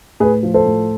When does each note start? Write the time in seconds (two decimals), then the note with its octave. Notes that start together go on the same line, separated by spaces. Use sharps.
0.20 A2 G#4 B4
0.43 F3
0.54 A4 C5
0.66 A2